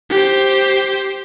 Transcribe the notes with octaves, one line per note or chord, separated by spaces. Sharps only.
G4 C5